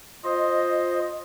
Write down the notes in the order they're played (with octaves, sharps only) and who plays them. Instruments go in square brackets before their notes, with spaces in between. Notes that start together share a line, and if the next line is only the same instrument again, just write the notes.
[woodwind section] F4 D#5 [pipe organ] C5